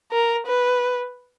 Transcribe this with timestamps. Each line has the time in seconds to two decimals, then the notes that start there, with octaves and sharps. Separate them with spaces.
0.12 A#4
0.47 B4